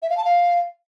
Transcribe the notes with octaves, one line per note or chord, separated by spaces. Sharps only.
E5
F5
A5
F5